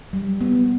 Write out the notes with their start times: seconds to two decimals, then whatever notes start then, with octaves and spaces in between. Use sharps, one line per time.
0.13 G3
0.41 B3